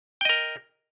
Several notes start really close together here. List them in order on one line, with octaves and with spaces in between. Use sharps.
G5 D#5 A#4